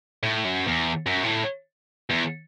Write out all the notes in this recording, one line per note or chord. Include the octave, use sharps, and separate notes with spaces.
A2
F#2
E2
F#2
A2
E2